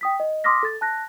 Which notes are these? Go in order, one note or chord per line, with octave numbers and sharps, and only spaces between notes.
G5 D#6 B6
D#5
C6 D6 D#6 F6 A#6 B6
A4 A6
A5 F#6 A#6